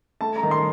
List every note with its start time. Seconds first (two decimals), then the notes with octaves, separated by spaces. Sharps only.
0.21 A3 A5
0.36 A#5
0.43 D#3
0.51 C6